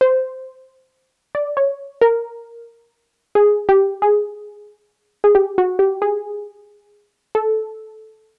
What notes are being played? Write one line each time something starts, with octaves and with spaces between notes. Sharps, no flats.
C5
D5
C#5
A#4
G#4
G4
G#4
G#4
G4
F#4
G4
G#4
A4